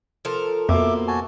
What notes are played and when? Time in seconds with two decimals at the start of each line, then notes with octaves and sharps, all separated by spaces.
0.25 F3 A4 A#4
0.69 F2 B2 A#3 E5 D6
1.08 F#4 G#5 A5